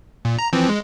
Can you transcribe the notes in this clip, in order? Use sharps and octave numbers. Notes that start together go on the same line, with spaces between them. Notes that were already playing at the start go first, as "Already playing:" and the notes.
A#2
A#5
E3 F3 C4
G#3